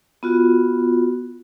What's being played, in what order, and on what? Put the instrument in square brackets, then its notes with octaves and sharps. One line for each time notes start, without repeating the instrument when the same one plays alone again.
[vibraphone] B3 F4 F#4